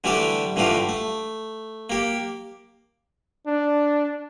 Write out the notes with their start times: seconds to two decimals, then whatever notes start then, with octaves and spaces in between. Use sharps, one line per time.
0.04 D3 E3 G3 A3 G4 A4
0.56 G2 D3 E3 A3 F4 G4
0.89 A3
1.90 A#3 G4
3.47 D4